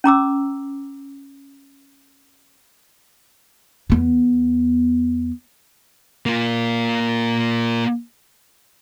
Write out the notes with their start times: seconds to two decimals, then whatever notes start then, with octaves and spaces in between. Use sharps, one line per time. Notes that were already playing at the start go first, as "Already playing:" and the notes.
0.04 C#4 A#5 D6 E6
3.90 E2 B3
6.26 A#3 F4